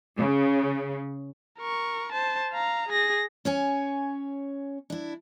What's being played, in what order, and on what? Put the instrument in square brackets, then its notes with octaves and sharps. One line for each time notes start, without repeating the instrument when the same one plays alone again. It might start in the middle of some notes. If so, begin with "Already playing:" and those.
[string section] C#3
[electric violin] A#4 C#6
C5 A5
F5 A#5
G#4 A#6
[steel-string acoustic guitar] C#4 C#5 G#5
D4 E4